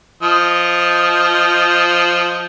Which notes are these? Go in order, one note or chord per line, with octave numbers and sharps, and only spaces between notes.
F3 D#5